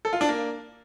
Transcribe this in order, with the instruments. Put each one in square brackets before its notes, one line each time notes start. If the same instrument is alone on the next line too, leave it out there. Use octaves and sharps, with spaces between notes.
[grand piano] A4
F4
D4
A#3